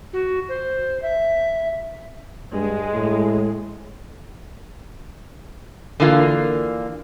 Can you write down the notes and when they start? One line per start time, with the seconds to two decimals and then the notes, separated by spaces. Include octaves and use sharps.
0.13 F#4
0.49 C5
1.02 E5
2.53 G2 G#3
2.93 A2
6.00 D3 E3 A#3 F4